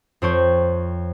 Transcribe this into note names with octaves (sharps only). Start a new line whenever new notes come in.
F2 C4 A4 C#5 C#6 G6